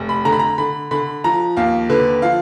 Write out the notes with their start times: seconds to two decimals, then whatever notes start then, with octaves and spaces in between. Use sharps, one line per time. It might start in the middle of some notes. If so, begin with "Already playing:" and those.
Already playing: F1
0.09 B5
0.25 D3 A#5
0.32 B5
0.39 A#5
0.58 D3 B5
0.91 D3 B5
1.24 F3 A#5
1.57 D#2 F5
1.90 D3 B4
2.22 F3 F5